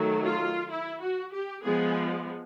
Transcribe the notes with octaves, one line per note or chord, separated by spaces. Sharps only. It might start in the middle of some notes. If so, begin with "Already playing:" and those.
Already playing: D#3 F#3 A3
F4
E4
F#4
G4
F3 G#3 B3 G#4